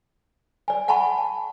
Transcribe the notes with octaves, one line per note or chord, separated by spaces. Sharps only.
D5 G#5
F#5 G#5 A5 B5 C#6